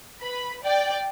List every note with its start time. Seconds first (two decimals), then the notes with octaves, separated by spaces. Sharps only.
0.22 B4 B5
0.63 D5 G5